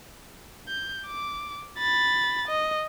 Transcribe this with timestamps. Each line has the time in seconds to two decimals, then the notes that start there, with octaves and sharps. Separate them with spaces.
0.68 G6
1.07 D6
1.78 B5 A6
2.48 D#5